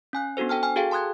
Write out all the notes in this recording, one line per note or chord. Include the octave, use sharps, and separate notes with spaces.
C#4 G#5 F#6
B3 D4 F#4 A4 C5
A4 G5 A5 F6
G#5 F6
F#4 G#4 A4 F5 G5
A5 C6 D#6 F#6 G#6